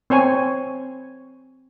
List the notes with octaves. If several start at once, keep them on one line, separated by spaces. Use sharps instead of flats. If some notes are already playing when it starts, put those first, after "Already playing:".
C4 C5 C#5 G#5